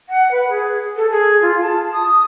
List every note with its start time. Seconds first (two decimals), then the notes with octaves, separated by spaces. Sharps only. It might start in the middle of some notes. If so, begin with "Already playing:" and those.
0.09 F#5
0.31 B4
0.49 G#4
0.97 A4
1.11 G#4
1.42 F4
1.62 A5
1.92 D#6